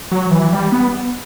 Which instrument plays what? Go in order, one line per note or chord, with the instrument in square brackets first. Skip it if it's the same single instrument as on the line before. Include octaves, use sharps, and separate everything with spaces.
[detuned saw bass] F#3
E3
G3
B3